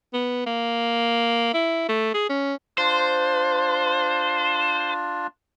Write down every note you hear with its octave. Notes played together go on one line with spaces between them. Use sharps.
B3
A#3
E4
A3
G#4
C#4
D4 F4 C5